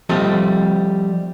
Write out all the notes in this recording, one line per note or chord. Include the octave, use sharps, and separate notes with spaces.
F3 G3 A3 C4 D#5